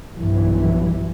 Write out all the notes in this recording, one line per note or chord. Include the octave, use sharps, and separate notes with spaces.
B1 G2 E3